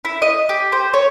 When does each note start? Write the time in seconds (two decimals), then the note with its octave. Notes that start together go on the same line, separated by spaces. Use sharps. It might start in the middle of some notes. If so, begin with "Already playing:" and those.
0.05 E4
0.22 D#5
0.49 G4
0.72 C5
0.94 C#5